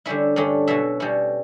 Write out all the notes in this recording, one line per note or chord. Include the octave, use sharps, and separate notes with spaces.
D3 G3 C#4 E4 E5
G2 D3 A3 C#4
B2 F#3 C#4 E4 E5
B2 G3 C#4 E4